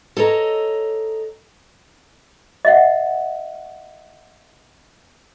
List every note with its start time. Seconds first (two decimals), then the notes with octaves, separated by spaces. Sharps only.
0.17 A4 C#5 D#5 A#5
2.65 D#5 E5 F#5